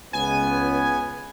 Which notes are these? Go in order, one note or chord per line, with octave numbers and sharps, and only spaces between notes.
C#2 B3 G#5